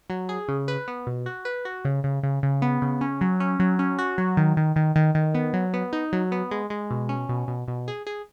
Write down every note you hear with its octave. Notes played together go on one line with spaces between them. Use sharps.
F#3
G#4
C#3
B4
B3
B2
F#4
B4
F#4
C#3
C#3
C#3
C#3
B3
C#3
C#4
F#3
C#4
F#3
C#4
F#4
F#3
D#3
D#3
D#3
D#3
D#3
B3
F#3
B3
D#4
F#3
B3
G#3
G#3
B2
C#4
B2
B2
B2
G#4
G#4